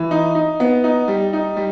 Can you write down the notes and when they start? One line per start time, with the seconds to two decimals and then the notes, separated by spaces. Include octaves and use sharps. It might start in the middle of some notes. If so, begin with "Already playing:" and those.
Already playing: E3
0.11 D#4
0.35 D#4
0.60 B3
0.84 D#4
1.08 G3
1.33 D#4
1.57 G3